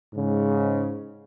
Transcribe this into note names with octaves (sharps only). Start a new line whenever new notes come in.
G#2 C#3